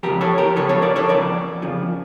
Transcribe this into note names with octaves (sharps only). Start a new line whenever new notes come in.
F2 C#3 F3 G4 A#4
A4 C#5
G4 A#4
F2 C#3 F3 A4 C#5
A4 C#5
A#4 D5
A4 C#5
F2 C#3 F3 A#4 D5
F2 C#3 F3